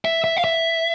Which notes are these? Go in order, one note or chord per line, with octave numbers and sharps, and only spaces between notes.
E5
E5
F5
E5